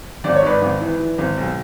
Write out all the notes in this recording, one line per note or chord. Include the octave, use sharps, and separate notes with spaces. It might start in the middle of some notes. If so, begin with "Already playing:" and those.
G#1 D5
C#5
G#2 B4 D5
G#1
E3
E3
G#1
B1